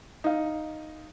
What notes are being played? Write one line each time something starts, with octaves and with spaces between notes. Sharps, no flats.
D#4 F5